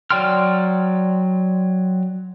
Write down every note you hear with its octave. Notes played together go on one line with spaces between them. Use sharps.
F#3 D5 G5 C6 F6